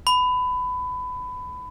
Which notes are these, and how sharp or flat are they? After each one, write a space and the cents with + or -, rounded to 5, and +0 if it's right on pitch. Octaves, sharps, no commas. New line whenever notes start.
B5 +20